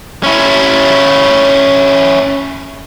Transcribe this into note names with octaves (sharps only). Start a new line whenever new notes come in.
C#4 E4